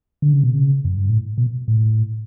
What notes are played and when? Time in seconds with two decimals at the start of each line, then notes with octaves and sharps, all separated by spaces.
0.22 D3
0.33 C#3
0.43 B2
0.54 C#3
0.85 F#2
0.96 G2
1.09 A2
1.38 B2
1.68 A2